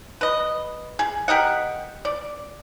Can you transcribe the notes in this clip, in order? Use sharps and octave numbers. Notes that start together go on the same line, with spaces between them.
B4 D#5
G#4
G4 A#4 D#5 F#5
D5